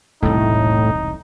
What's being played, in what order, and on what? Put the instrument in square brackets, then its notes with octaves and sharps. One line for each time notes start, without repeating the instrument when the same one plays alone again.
[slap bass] E1 C2 [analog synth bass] A2 [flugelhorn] D#4